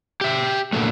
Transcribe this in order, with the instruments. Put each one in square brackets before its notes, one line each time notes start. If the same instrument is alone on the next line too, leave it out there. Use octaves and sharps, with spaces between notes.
[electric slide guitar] G4 E5
A#2 D3 F#3 A3